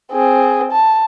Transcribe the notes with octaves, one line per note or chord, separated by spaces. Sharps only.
C4 G#4
A5